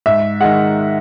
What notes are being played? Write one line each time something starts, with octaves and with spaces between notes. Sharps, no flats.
G#2 E5
D#3 G#3 F#5